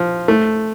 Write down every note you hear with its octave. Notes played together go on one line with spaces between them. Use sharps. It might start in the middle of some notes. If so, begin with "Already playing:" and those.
Already playing: F3
A3